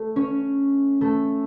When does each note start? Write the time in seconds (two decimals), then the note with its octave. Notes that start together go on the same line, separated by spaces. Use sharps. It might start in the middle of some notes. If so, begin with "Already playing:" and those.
Already playing: A3 A4
0.16 C#4 C#5
1.01 A3 A4